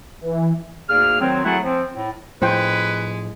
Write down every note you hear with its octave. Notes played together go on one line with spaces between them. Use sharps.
E3
D2 G#2 A#3 G#4 D5 F6
D2 D#3 F#3 C4
F#3 A3 E4 F#4 G#4 F#5
F3 C4
A2
A2 F3 G#3 B4 C5 G5